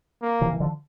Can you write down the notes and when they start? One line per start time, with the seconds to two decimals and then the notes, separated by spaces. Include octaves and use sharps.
0.22 A#3
0.41 C3 E3
0.53 E3
0.60 D3 F3